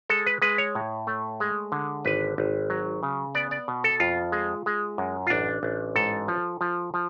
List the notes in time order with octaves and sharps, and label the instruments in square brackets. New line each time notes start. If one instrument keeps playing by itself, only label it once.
[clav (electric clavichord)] G#3 A4
B4
G#3 B4
C#5
A2
A3
G#3
D3
G#1 B4
G#1
F#3
C#3
B3 D5
D5
B2
A4
F2 F4
G#3
G#3
F#2
F4
A1 D4
A1
G#2 A4
F3
F3
F3